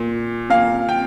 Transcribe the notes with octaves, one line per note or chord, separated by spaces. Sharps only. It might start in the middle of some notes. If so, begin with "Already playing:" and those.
Already playing: A#2
A#2 F5
G5